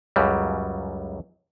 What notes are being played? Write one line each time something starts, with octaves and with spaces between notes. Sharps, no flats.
C#2 F#2 C#3 F#3 G3